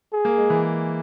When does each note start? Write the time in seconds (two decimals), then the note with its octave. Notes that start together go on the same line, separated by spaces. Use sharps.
0.13 G#4
0.25 A#3
0.38 G#3
0.50 E3